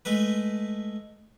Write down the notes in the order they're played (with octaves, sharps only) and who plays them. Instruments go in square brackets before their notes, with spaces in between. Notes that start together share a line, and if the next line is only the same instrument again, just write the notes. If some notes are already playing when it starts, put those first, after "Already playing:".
[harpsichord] G#3 A3 B4